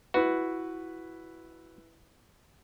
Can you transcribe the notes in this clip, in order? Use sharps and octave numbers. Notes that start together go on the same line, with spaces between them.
E4 F#4 B4